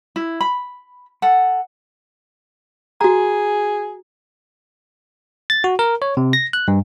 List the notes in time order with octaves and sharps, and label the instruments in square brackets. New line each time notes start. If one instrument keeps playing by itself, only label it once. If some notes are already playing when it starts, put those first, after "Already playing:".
[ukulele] E4
B5
A4 F#5
[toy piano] F#4 A#5 [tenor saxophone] G#4
[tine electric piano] A6
F#4
A#4
C#5
C3
A#6
F#6
G2